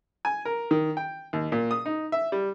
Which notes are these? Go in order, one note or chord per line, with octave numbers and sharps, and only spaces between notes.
G#5
A#4
D#3
G5
D#2
A#2
D#6
D#4
E5
G3